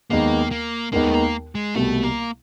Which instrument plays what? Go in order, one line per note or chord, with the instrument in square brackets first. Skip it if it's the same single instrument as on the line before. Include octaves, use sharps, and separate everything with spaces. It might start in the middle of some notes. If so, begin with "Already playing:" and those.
[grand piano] D#2 D#3 G#3 B3 D#4 [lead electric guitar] A#3
[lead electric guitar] A#3
[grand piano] D#2 D#3 G#3 B3 D#4 [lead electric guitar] A#3
[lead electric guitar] A3
A#3
G#3
[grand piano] C2 B2 G3 B3 [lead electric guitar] A3
[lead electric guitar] A#3